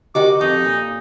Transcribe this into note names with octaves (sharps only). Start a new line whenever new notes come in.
D#3 F#4 G4 C5 D#5 G5 D6
F2 D#4 A4 C#6
A#2